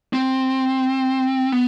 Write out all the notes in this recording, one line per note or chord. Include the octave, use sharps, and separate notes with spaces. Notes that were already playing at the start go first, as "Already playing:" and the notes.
C4
B3